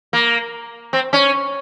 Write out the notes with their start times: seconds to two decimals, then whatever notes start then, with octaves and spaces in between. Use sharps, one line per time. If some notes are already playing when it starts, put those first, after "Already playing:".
0.13 A#3
0.93 C4
1.13 C#4